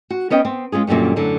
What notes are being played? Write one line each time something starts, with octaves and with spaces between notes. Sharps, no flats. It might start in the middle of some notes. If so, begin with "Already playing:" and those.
F#4
B3 C#4 D#5 G5
B3 C4
G#3 C#4 F4 G#4
F#2 A#2 D3 G3 C#4
F#2 A2 D3 F#3